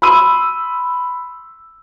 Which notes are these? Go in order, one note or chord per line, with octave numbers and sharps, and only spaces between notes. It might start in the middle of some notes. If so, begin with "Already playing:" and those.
B5 C6 E6 D#7